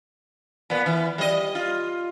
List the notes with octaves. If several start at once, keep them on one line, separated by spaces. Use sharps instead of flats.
A#2 B3
E3
G3 D#5
F4